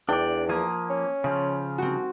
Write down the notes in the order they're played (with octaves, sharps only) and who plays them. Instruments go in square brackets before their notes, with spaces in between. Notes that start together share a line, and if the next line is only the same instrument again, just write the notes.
[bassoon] E2 [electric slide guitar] D4 D5 [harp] G5
[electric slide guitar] F3 A#3 [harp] D#6 G#6
[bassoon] C#4
[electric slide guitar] C#3 F3
[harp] C4 F#4